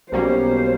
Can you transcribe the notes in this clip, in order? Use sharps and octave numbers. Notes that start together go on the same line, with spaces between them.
B1 B2 G3 A#3 C#4 C5